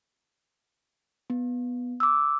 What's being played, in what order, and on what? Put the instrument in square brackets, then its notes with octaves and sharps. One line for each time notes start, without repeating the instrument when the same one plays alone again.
[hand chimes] B3
D6 E6